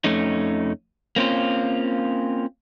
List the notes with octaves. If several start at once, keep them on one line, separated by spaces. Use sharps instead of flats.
F2 A3 C#4 D#4
A#3 C4 C#4 F4